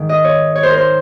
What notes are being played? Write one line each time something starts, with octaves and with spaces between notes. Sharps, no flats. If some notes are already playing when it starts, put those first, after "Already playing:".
Already playing: G#2 D#3
D#5
C#5
C#5
C5
A#4
C5